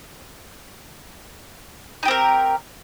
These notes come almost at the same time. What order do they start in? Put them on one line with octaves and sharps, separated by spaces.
D#4 G4 C4 A#4